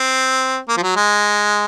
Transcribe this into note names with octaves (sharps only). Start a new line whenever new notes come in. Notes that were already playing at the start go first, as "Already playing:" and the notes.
Already playing: C4
A#3
F3
F#3
G#3